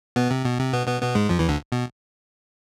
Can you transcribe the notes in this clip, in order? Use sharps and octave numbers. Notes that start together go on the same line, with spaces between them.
B2 B3
C3
B2
C3
B2 B3
B2 B3
B2 B3
G#2 G#3
F2 F3
E2 E3
D2 D3
B2